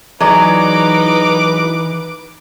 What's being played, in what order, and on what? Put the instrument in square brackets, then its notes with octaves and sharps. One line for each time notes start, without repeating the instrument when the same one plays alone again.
[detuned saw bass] E3 [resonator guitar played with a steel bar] F#3 G#3 D5 [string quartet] D#4 [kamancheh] B4 D6